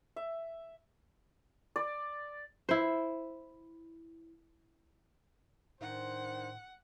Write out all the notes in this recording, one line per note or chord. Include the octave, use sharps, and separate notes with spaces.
E5
D5
E4 C5
A2 D#3 D4 C5 F#5